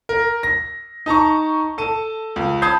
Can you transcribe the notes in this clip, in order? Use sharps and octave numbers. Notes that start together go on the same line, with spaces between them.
A#4
A#6
D#4 A5 A#5 C#6
A4 A5 D#7
C#2
A5 B5 D#6 G6 G#6 C7